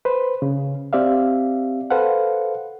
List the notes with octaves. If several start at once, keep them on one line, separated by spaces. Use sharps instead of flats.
B4 C5
C#3
C4 G4 D5 E5 F5
A4 B4 C5 F5 F#5